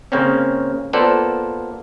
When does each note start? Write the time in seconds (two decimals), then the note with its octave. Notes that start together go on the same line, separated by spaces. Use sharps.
0.12 C#3 A#3 C4 C#4
0.93 A#3 B3 F4 A4 C5 D5